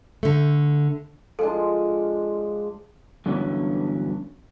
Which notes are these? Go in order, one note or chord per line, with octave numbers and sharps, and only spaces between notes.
D3 A3
F3 G#3 D4 A4
G2 D3 E3 F#3 B3 C#4